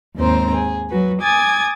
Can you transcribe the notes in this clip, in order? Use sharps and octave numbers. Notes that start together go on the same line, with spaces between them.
D#2 G#2 C4 C5 A#5
G#4
F#3 F#4 B4
G#5 D6 D#6 G#6 A6